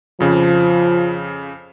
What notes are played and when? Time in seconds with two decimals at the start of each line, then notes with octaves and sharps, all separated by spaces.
0.20 F2 C#3 F3